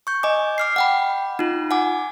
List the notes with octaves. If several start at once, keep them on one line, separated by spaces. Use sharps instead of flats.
C#6 G6
D#5 G#5 D6
D6 F6 C7
F#5 G5 B5
D#4 F4
F#5 G#5 D6